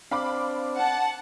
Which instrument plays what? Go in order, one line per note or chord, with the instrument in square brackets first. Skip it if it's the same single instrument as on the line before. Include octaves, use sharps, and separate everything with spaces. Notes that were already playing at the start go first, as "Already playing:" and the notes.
[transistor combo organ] C4 D4 [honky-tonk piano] F5 B5 D6
[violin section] F#5 A5